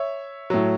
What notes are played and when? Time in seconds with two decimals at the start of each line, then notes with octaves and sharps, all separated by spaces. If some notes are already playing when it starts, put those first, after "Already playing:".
Already playing: C#5 E5
0.50 A2 F#3